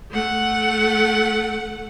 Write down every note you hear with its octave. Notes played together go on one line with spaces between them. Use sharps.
A3 F#5